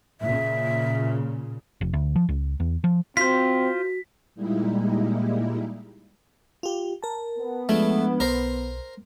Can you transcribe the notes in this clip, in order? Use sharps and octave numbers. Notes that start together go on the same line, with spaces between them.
A#2 C#3 E5
F1
D2
F3
C#2
E2
F3
C4 F4 F#4 C5 B6
A#2 G3 G#3 A#3 D#4 E4
F4 G4
A#4 A5
B3
F3 G#3 A3 D4
B1 A#4 C5